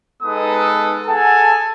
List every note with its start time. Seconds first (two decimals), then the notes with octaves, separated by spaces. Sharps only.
0.23 G#3 B3 D#4 A4 B4 D#6
1.07 G#4 A4 F#5 G#5 A5